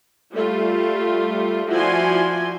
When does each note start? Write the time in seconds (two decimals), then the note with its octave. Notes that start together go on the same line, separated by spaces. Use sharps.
0.34 G3 A3 F4
1.70 F3 E4 F#4 D5 G#5 C6